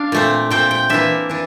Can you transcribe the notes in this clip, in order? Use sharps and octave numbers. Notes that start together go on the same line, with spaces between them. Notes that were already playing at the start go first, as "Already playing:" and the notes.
Already playing: D4 F5
A#2 A3 C4
A#2 A3 C4 G5
G5
E3 A#3 D4 E5
E3 D4